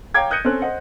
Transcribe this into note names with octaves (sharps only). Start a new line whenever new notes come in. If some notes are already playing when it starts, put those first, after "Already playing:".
C#5 F5 G5 A#5 D6 G#6
D#6 F#6 G6 A#6 C#7 D#7
C4 C#4 A4 C5 F#6
C5 D#5 F#5